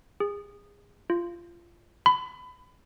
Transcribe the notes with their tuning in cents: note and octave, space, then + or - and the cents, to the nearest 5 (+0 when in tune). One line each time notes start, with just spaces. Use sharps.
G#4 -30
F4 -20
B5 +25